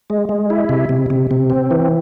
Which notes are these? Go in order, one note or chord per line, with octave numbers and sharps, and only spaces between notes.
G#3
G#3
E4
C3
C3
C3
C3
C4
E3